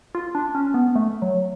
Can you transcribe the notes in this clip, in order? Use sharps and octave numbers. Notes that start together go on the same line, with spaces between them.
F4
D4
C#4
B3
A3
F#3